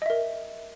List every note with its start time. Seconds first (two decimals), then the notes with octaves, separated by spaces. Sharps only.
0.02 D#5
0.06 E5
0.10 A#4